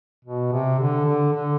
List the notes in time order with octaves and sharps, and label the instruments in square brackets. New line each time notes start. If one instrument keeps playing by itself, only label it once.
[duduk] B2
C3
D3
D3
D3